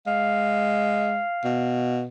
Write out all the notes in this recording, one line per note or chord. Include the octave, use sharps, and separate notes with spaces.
G#3 F5
B2